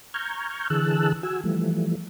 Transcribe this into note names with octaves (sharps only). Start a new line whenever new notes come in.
A#5 C#6 F6 G6 G#6
D3 E3 G#4 A5 E6 F#6
F#4 G#5 E6
E3 F3 G3 A3